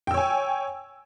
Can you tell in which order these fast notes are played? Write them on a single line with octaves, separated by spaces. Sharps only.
G5 E6 C#5 G#5